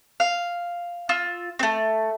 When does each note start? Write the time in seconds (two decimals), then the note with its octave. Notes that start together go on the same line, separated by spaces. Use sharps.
0.20 F5
1.09 F4 E6
1.59 A3 C4